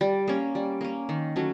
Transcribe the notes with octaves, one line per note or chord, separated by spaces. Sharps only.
G3
A#3 C#4
G3
A#3 C#4
D#3
F#3 A3 C#4